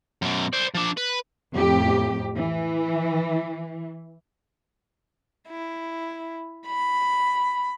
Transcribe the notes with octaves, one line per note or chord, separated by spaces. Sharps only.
F#2 B2
C5 D5
F3 D4
B4
F2 A2 G4
E3
E4
B5